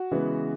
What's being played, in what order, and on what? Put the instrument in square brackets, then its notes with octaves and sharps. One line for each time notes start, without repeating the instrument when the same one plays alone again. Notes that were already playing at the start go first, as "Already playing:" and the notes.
Already playing: [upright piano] F#4
C#3 E3 G#3 B3